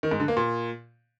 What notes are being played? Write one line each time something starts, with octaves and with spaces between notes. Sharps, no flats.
D#3
G#2
D3
A#3
A#2